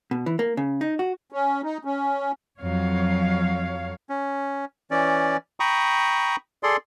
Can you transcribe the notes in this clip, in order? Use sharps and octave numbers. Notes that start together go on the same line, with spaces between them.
B2
E3
A#3
C#3
D#4
F#4
C#4
D#4
C#4
F2 F#3 C#5 F5
C#4
E3 C#4 D5
G5 A#5 B5 C#6 D#6
G#4 A4 D5 C6